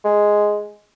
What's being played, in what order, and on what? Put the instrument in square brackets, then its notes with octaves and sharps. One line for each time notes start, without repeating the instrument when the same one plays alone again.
[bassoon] G#3